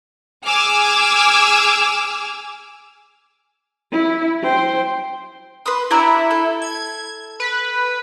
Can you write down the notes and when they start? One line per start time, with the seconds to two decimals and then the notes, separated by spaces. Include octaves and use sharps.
0.45 G#4 G#5 D6 E6 F6
3.92 E4
4.44 C5 G5
5.66 B4 C6 D#6
5.91 D4 E4 G4 A#5
6.31 A4
6.62 G#6
7.40 B4